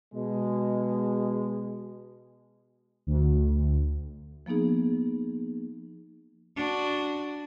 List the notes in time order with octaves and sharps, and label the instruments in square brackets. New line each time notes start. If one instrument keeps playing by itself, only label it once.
[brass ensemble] B2 G#3
[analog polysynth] D2
[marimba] F3 A#3 B3 D#4 G#4
[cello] D4 F#4